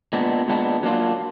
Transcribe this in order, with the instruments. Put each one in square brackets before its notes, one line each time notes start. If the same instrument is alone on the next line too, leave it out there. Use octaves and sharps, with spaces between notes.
[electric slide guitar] A#2 G#3 B3 D4
A#2 G#3 B3 D4
F#3 A#3 D4 F4